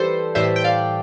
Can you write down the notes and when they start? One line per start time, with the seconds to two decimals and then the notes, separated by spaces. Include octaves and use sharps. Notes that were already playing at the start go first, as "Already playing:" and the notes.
Already playing: E3 G3 G4 A4 B4 C5
0.35 A2 E3 G3 C5 E5
0.56 G5
0.64 D5 F5